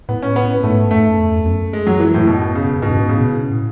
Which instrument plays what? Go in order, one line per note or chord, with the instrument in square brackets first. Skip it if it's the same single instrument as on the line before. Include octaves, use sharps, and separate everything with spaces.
[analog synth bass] A2 [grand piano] B3
[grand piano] C#4
B3
[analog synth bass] G#2 [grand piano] A3
[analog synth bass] F#2 [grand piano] A3
[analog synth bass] G#2
F#2
E2
F#2
[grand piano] G#3
F#3
E3
A2
B2
C#3
[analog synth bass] G#2 [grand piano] B2
[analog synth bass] A2
G#2
[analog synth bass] A2 [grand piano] C#3
[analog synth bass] B2
A2